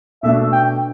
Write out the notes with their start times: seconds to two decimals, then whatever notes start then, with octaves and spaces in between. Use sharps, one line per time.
0.23 B2 A3 D4 E5
0.53 G5